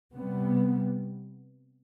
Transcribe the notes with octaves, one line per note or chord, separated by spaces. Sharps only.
C3 G3 B3